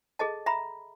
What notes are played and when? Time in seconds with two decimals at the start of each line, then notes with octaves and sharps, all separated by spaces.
0.19 G#4 A4 D#5 A5
0.46 E5 A#5 B5